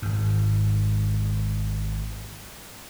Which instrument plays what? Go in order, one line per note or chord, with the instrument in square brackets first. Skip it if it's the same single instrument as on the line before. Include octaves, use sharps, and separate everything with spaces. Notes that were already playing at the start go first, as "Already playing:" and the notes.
[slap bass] G#1 G#2